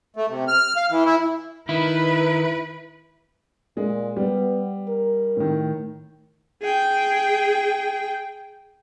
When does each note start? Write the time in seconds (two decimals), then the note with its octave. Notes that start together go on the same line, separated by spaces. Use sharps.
0.16 A3
0.29 C3
0.48 F6
0.77 F5
0.90 E3
1.06 E4
1.69 D#3 E4 B4
3.77 A#2 G#3
4.17 G3 B3
4.88 A#4
5.36 A2 D#3
6.62 G#4 G5